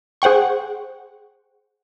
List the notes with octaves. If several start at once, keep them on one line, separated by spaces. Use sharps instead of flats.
G#4 C5 F#5 G5 C#6